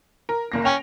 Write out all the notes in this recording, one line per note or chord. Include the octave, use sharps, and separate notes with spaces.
A#4
F#1 A#3 A#6
C#4 G5 F7